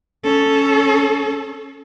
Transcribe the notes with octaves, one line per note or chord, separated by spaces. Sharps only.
C#4 A4